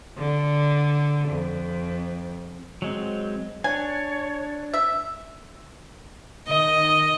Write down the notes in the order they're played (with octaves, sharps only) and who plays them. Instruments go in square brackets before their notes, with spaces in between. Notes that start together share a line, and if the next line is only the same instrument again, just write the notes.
[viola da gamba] D3
F2
[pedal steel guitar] F#3 G#3 C4
[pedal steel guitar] D4 [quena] C#5 [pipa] G#5
[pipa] E5
[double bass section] D#3 [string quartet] D#5